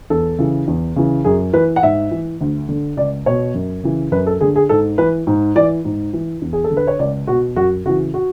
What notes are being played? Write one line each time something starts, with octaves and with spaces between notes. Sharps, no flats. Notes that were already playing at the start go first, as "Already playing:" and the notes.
E2 A4
C#3 E3
E2
C#3 E3
F#2 G#4
E3 B4
F#5
G#2 E5
E3
D2
D3
C#2 D5
B2 C#5
F#2
C#3 E3
F#2 B4
A4
D3 G#4
G#4
G#2 A4
E3 B4
G#2
E3 D5
G#2
E3
E2
G#4
A4
D3
B4
C#5
C#2 D5
B2 F#4
F#2 F#4
C#3 E3 F#4
F#4